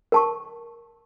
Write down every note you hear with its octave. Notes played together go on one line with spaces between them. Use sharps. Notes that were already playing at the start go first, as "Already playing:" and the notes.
A#4 A5 C#6